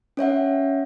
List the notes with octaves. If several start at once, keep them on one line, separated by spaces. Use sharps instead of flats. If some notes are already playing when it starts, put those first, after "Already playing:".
C#4 C#5 E5 F#5